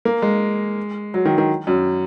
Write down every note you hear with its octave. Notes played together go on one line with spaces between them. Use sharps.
A#3
G#3
F#3
D#3
D#3
F#2